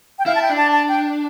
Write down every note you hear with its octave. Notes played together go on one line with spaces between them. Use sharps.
G5
E4 F5
A5
G5
D4
A5
A5
G5